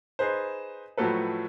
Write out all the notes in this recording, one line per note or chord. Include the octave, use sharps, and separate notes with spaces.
D#4 G#4 B4 C5
A2 F3 F#3 A3 A4 B4